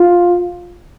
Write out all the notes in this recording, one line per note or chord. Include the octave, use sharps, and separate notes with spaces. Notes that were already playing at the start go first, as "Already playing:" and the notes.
Already playing: F4